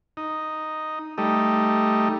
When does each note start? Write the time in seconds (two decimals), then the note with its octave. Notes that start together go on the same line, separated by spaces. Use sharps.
0.17 D#4
1.18 G3 A3 D#4